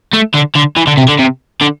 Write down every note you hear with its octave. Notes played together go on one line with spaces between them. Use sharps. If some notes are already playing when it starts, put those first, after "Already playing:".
A3
D3
D3
E3
D3
C3
D3
C3
D3